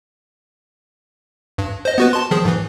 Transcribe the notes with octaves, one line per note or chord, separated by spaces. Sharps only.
G2
C5 D#5
B3 F#4 B4
A5 C6
D#3 F3 G#4
G#2 E3